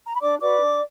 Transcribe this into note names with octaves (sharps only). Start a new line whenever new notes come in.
A#5
B5
D4 D5 D6
F#4 B4 D5 D6
D4